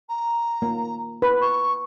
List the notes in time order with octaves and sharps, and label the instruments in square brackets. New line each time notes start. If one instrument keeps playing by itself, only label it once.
[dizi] A#5
[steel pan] A#3
B4
[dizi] C#6